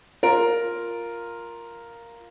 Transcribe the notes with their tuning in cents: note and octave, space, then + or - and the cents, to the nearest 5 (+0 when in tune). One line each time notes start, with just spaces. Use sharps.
F4 +0 A#4 +0